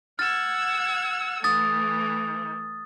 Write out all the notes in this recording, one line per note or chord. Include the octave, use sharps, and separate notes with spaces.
F#5 E6 F6 G#6 A6
E3 A3 D#6 A6